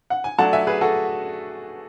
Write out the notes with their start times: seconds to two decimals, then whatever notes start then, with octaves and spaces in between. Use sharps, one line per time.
0.10 F#5
0.24 G#5
0.38 F#3 A3 D4 F#5 A5
0.53 E5 G#5
0.67 G#4 B4
0.81 F#4 A4